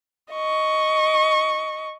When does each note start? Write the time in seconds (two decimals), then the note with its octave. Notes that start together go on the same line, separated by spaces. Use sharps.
0.33 D#5 C#6